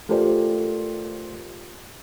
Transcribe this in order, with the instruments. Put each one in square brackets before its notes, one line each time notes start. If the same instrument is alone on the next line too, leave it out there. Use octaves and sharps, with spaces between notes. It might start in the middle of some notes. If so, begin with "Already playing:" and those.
[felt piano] A3 F4 G4 A#4 C5 D5